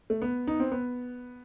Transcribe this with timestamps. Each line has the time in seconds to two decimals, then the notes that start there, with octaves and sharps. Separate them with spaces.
0.10 A3
0.22 B3
0.47 D#4
0.60 C4
0.72 B3